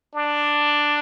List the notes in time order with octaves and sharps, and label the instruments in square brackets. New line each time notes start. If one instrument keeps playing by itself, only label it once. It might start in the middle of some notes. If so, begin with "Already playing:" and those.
[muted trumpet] D4